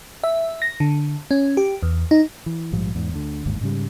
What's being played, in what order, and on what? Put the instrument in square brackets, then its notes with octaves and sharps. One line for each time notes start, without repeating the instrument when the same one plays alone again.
[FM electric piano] E5
A#6
D3
C#4
G4
E2
D#4
[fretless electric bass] E3
A#1 G#2 F3 G3
E2 G#2
D2 D3
G1 D#2 G#2
G#2 C#3 G3